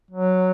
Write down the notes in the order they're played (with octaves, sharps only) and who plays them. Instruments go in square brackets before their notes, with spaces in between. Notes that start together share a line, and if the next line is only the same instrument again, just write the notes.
[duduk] F#3